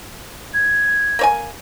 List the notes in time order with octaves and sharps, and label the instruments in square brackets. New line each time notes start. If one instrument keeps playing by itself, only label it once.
[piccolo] G#6
[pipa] A#3 C#5 G#5